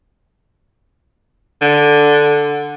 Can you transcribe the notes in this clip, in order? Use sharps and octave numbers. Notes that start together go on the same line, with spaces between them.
D3